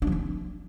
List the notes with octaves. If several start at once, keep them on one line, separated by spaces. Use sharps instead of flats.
D4
F3
C4